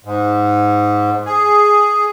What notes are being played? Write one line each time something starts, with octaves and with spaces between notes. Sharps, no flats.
G#2
G#4